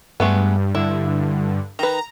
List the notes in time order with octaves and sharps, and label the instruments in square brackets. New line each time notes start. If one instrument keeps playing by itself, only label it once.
[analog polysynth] G2 [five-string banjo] G#3 A3 B3
[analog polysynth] G2 D3 [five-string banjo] E4
[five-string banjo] D#3 B4 [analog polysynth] A#5